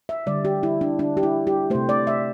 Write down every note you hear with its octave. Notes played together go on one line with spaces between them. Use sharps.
E5
D3 G3 D5
G4
E4
D4
D4
G4
E4
G4
C3 A3 C5
D5
E5